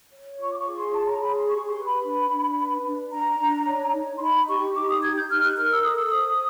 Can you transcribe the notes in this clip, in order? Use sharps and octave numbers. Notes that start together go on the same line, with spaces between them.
C#5
F4 C#6
D6
C#6
G#4
C6
C#5 A5
A#5
G#4 B5
C6
G4 C#6
C6
B4
B5
D4
D4
B4
D4
D4 A#5
D4
C#5
D#4
C6
D#4 B5
G4 C#6
D#4 D6
D#6
G4 G#6
G6
D#4 F6
F#6
A#4 F6
E6
A4 D#6
E6
C5 D#6